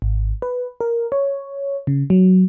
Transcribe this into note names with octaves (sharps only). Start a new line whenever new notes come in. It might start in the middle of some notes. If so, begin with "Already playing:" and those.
G#1
B4
A#4
C#5
C#3
F#3